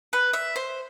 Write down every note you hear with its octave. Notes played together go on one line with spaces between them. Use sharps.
B4
E5
C5